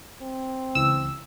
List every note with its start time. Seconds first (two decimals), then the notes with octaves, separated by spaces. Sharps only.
0.21 C4
0.75 C#2 E3 E6